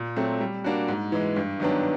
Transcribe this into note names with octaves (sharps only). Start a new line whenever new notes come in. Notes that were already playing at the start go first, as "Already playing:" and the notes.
Already playing: A#2
F#3 A3 C4
G3
A#3 D4 F#4
G#2
E3 G#3
G2
D#3 F#3 B3 D4